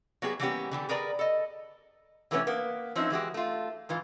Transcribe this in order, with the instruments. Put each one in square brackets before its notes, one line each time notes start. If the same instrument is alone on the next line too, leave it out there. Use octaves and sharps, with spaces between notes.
[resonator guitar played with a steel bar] F#3 A#3 B3 E4 G4 G#4
E3 G3 A#3 B3 C#4 G4
D3 E3 G4
G#4 A#4 B4 D5 A#5
A4 D#5
C3 E3 A3 B3 C#4
A#3 B3
F3 C4 C#4 D#4 E4
E3 G#3 F#4 G4
A3 F4
G#2 E3 F4